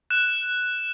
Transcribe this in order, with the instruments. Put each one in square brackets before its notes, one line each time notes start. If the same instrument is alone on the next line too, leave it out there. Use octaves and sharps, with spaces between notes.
[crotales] F#6 E7